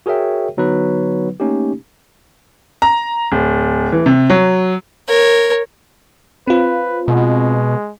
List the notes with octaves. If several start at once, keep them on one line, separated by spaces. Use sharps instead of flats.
F#4 G#4 A#4 C#5 E5 G5
D3 F#3 B3 D#4 B4
A3 A#3 C#4 D#4 G4
A#5
D1
E3
C3
F#3
A#4 C#5
C4 F4 B4
B2 G#3